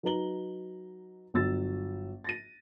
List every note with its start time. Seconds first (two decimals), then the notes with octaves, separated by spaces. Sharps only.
0.03 F#3 D#4 B4 A#5 F#7 G7
1.34 G1 F#3 E6 A6
2.24 A6 A#6 D#7